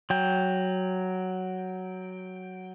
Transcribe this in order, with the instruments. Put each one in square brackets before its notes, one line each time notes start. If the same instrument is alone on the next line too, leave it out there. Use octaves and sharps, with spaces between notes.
[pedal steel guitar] F#3 G5